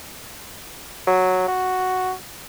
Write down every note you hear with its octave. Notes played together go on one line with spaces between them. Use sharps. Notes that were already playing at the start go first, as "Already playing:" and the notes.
F#3
F#4